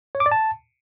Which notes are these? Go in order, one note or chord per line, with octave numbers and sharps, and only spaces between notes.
C#5
D6
D5
A5